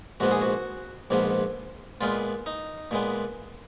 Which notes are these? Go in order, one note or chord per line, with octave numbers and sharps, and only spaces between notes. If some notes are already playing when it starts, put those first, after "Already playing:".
A#1 G#2 F3 B3 F#4
G#4
F#4
A#1 G#2 F3 B3
A#2 G#3 B3 F4
D#4
A#2 G#3 B3